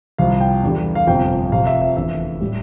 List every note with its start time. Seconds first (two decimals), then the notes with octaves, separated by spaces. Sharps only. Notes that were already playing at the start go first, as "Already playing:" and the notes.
0.18 C2 C3 F3 F5
0.40 G5
0.63 E2 D3 G3
0.95 F5
1.07 G1 F2 C3 F3 G5
1.52 F1 F2 C3 F5
1.67 E5
1.82 E5
1.96 F1 E2 D3 E5
2.41 A2 G3